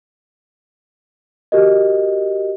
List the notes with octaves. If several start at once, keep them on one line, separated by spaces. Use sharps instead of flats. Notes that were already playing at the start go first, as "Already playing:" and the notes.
F#4 G4 A#4 D#5